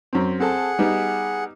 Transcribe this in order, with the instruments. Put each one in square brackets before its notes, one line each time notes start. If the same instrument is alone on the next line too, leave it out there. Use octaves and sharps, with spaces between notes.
[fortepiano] F#2 C4
[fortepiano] C4 A4 [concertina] G#4 F#5
[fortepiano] G3 B3 D#4